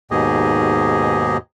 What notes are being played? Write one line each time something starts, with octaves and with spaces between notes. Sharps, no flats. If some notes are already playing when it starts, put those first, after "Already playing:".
D#2 G#2 B2 G4 G#4 D#5